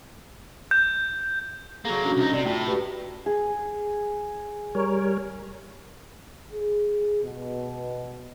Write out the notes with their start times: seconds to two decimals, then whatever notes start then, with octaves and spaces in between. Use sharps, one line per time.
0.71 G6
1.85 F#3 A#3 G#4 A4
2.04 C#4 D4 F#4
2.17 C2 D#4
2.33 C3 D5
2.46 A2 F4 G5
2.67 F#4 G4 B4
3.26 G#4
4.75 G3 A#4 C#5
6.53 G#4
7.23 B2